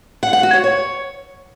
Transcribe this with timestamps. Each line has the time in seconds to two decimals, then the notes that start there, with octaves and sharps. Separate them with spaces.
0.23 F#5
0.33 F#5
0.43 F#4
0.53 C#5
0.64 C#5